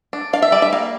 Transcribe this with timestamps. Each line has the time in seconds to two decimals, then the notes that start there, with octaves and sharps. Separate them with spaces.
0.13 D4
0.33 D4 F5
0.42 E5
0.52 G3 D5
0.62 E5
0.72 A#3 F5